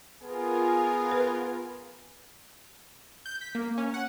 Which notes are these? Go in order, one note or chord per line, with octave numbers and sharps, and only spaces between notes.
B3 F4 G#4 A#4 G#5
B4
G6
B6
A#3
C#4
F#5